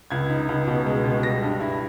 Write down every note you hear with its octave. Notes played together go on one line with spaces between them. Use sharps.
C#2 G#6
D#4
C#2
B2
G#3
B2
G3 A#6
G2
E4